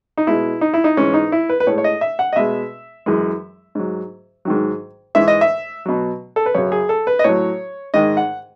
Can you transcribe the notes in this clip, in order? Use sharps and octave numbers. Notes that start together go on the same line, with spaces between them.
D#4
B2 G#3 E4
D#4
E4
D#4
G#2 E3 G#3 C#4
D#4
E4
B4
B4
A2 G#3 C#5
C#5
D#5
E5
F#5
D#5
B2 G#3 E5
F#2 E3 G#3
G#2 F#3
G#2 D#3 F#3
G#2 E3 G#3 E5
D#5
E5
B2 F#3
A4
B4
F#2 C#3 F#3 C#5
G#4
A4
B4
D#5
A2 F#3 C#5
G#2 D#3 G#3 D#5
F#5